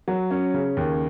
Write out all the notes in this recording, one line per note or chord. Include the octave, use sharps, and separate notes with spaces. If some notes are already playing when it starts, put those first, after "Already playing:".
F#3
C#4
C#3
D#2